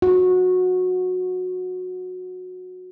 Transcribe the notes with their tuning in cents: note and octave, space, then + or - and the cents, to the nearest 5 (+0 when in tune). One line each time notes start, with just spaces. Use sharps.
F#4 -15